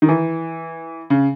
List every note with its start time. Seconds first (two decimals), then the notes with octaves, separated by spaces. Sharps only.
0.02 D#3
0.09 E3
1.10 C#3